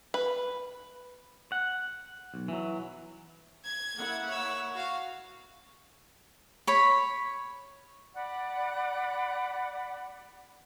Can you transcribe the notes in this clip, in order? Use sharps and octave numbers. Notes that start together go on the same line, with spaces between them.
B4
F#5
B1
E3 F#3
G#6
A#3 E4 F#5
C#5 E6
F#4 F5
C#5 B5
D5 F#5 B5